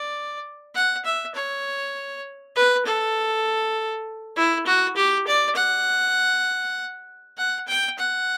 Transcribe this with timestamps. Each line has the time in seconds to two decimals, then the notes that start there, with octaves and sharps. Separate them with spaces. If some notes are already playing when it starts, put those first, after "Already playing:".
Already playing: D5
0.75 F#5
1.04 E5
1.34 C#5
2.55 B4
2.85 A4
4.36 E4
4.66 F#4
4.96 G4
5.27 D5
5.56 F#5
7.37 F#5
7.67 G5
7.98 F#5